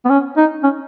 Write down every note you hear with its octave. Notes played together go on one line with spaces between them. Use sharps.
B3
C#4
D#4
C#4